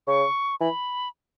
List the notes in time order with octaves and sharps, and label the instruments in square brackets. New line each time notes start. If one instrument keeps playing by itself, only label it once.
[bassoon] C#3 [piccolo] C#6
[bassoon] E3 [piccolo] B5